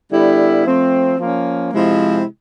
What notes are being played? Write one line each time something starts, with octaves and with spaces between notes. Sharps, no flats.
D3 G3 B3 E4
F3 A3 C4
F3 A#3 C#4
C3 F3 G#3 C4 E4